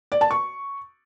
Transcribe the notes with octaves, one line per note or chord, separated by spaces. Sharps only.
D5
A5
C#6